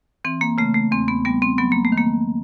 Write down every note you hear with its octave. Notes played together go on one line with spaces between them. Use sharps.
E3 C4
A#3
C#3 A3
A3
E2 C4
B3
G3 B3
C4
F#3 B3
A#3
A3
D#3
A#3